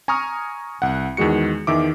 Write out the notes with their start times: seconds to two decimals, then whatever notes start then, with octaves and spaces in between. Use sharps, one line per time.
0.08 G#5 A#5 C#6 D#6 F6
0.82 C2 F#5
1.17 E2 D#3 G#3 F#4 C#7
1.67 E2 D#3 E5 D6